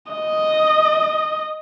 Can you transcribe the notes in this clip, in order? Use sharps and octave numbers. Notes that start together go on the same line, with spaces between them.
D#5